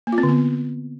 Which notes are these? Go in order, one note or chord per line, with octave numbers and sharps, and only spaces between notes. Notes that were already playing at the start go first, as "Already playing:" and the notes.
A#3
F4
C4
D3
B3